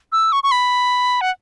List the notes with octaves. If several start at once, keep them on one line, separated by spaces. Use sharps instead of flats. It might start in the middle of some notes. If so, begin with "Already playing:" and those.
E6
C#6
C#6
B5
F#5